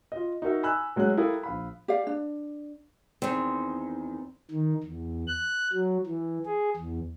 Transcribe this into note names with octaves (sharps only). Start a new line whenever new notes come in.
F4 D#5
D#4 F#4 A#4 E5
G#5 B5 E6 F#6
F#3 G#3 C#4 F#5 F#6
E4 G4 A4 A#4 F5 D#6
A#1 F5 B5
G4 D5 F5
D4
E2 D#3 C4
D#3
E2
F#6
F#3
E3
G#4
E2